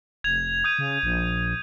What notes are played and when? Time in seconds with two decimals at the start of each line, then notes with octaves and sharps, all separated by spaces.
0.24 F1 G#6 F7
0.64 D#6 G6 D#7
0.79 C#3
1.03 A#1